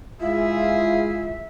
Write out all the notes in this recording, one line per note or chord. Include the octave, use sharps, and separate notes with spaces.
G#3 E4 F4 G#4 E5